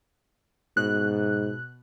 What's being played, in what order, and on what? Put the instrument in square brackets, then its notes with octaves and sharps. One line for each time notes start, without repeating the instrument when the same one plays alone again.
[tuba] G#2 [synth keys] B2 F#6